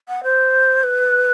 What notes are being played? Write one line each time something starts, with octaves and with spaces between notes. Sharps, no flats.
F#5
C5
B4